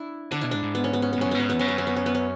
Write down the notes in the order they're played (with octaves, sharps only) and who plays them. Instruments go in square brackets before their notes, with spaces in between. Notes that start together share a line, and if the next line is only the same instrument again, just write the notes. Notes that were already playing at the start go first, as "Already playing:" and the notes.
Already playing: [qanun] D4 E4
[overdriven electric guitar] D3 [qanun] D4
[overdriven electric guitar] B2 [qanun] E4
[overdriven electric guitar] G#2 [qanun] D4
[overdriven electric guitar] G#2
[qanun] B3
C#4
B3
C#4
B3
[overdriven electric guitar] G#2
[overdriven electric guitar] F#2 [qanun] C#4
[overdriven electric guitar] G#2 [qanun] B3
[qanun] C#4
[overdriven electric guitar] E2 [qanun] B3
[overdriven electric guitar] F#2 [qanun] C#4
[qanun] B3
C#4
B3
C#4
B3
C#4